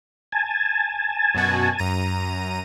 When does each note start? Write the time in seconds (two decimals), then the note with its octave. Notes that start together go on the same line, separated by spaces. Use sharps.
0.32 G#5 A5
1.35 F#2 B2 F#4
1.79 F#2 A#5 D#7